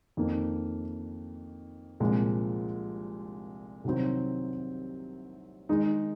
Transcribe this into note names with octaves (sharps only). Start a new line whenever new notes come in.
F2 D#3 A#3
C2 A#2 F3 G#3
C2 C3 D#3 F#3 C4
D#3 G#3 D#4 G#4